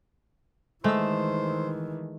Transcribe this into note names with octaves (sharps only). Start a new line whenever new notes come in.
D#3 E3 G#3 A3 C5 E6